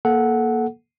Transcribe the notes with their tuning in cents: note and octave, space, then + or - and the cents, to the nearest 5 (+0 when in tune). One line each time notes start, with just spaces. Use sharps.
A#3 +10 A4 -20 F#5 +0